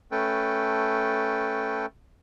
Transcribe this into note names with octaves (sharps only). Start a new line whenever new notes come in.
A3 C#4 A4 B4 G5